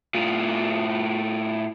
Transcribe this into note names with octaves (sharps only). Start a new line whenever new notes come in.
A2 F4